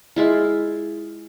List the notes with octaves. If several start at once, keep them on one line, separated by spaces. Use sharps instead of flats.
G#3 E4 F4